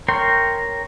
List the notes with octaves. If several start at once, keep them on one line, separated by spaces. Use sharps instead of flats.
A#4 C#5 G5 C6